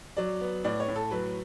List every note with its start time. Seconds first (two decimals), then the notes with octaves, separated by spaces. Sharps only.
0.17 F#3 D5
0.41 B3
0.64 A2 D5
0.80 C#5
0.88 A2
0.96 A4
1.11 F#3 B4